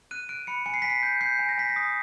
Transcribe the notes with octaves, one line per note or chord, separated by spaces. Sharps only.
F#6 D#7
F#6 D7
B5 C#7
G#5 C#7
C7
G#5 B6
C7
G6
G6 C7
G#5
A#6
G#5 B6
A#6
D#6